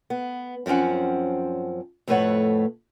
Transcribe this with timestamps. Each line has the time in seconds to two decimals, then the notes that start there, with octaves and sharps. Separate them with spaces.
0.10 B3
0.66 F#2 F3 C4 C#4 F#5
2.08 F2 A2 A3 B4 C#5 F#5